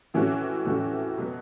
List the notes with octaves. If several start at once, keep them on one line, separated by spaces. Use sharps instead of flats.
A2 E3 A3 C#4 F#4
A2 E3 A3 C#4 F#4
B2 F#3 B3